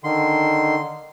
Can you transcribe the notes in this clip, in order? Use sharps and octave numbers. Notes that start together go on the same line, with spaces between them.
D3 D#3 C6